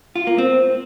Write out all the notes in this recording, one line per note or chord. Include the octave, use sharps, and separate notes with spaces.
F4
A#3
C4